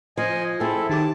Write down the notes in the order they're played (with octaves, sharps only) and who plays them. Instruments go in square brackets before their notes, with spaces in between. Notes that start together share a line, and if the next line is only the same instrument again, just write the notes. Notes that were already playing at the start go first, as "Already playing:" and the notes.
[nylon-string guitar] F3 [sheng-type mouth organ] D#5 G#5
[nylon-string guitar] C4 G#4 [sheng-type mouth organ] E4 A4
[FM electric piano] D#3 G4 D6 [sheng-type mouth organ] A5